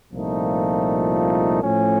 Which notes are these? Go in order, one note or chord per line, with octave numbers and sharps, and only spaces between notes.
C2 A#2 F3 A3 D#4
A2 F3 A3 C#4